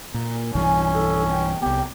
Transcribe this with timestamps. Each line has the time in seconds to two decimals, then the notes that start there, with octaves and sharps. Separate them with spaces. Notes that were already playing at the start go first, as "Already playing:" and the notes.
0.14 A#2
0.55 B1 G2 E3 C#4 G#5
0.93 A4
1.31 G5
1.62 C2 B3 G4